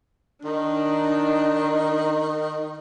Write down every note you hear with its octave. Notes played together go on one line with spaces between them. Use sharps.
D#3 D4 D#4